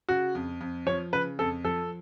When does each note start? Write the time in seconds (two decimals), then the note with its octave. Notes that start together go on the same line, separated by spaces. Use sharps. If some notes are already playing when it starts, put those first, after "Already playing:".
0.09 C#3 F#4
0.35 F2
0.61 F2
0.86 F3 C#5
1.13 C#3 B4
1.39 F2 A4
1.64 F3 A4